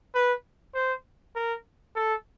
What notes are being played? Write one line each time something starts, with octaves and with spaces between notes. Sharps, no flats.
B4
C5
A#4
A4